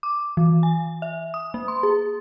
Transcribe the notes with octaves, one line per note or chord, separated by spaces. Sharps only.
D6
E3
G#5
E5
D#6
A#3
C6
G#4